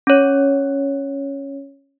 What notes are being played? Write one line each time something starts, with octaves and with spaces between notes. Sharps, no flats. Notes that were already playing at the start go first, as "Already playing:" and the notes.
C#4 C#5